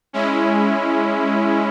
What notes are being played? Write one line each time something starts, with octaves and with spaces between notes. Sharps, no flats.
G#3 C#4 E4